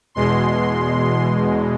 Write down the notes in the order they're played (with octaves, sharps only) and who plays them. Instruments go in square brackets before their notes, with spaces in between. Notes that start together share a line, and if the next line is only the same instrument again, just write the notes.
[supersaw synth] E2 B2 G#3 C6